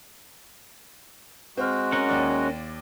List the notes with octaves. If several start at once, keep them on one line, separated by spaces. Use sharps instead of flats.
G#3 C4 F#4 F6
C#4 A#4 F#5
D#2 D5